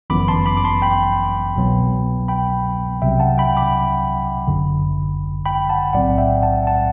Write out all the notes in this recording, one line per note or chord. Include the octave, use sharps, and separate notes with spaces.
G1 F#2 E3 B3 B5 D6
A5 C6
B5 D6
D6
A5 C6
G5 B5
C2 B2 F#3 B3
G5 B5
C2 C3 F#3 E5 G5
F#5 A5
G5 B5
B5 D6
G1 F#2 D3
G5 B5
F#5 A5
B1 A2 F#3 C4 D5 F#5
E5 G5
F#5 A5
F#5 A5